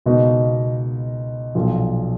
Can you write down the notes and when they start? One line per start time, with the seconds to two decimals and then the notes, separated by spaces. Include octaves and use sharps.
0.06 C#2 B2 A#3 D#4
1.55 B1 A#2 F3